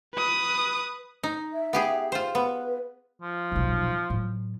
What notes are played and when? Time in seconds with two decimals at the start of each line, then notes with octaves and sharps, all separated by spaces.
0.15 B4 D#6
1.23 D#4
1.53 E5
1.73 B3 G4 G#4
2.12 F4 C5
2.35 B3 B4
3.22 F3
3.52 D#1 B1
4.10 A2 F#3